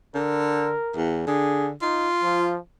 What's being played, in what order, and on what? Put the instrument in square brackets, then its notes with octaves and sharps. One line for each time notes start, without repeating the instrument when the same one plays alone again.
[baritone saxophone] D3 [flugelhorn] A#4
[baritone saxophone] E2
[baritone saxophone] D3 [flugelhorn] G#4
[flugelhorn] D#4 [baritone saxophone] F4
[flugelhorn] F3